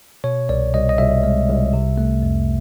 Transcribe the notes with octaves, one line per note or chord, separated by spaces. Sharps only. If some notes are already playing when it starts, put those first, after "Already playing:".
B2 C#5
C2 D5
C2 D#5
D#5
C2 E5
G#3
C2
C3
A3
F2